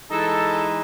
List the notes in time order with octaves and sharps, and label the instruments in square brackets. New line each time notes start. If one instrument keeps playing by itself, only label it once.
[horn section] E3 G#3 D#4 A4